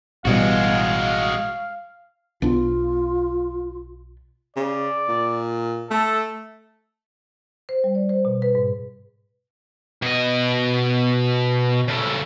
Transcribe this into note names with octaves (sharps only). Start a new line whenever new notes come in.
A1 B2 G3 G#3 F#4 F5
B1 B3 D4 F4
C#3 D5
A#2
A3 A4
C5
G3
D5
C5
B2
B4
G#2
B2 D#5
C#3 A3